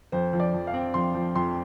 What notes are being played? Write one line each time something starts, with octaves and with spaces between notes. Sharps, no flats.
F2 C5
F3
D5
F2
F5
C4
F2 C6
F3
F2 C6